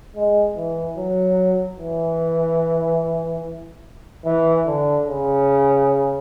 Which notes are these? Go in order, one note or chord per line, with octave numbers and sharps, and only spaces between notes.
G#3
E3
F#3
E3
E3
D3
C#3